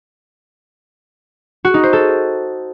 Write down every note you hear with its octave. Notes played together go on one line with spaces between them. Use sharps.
F#4
D#4
C5
A4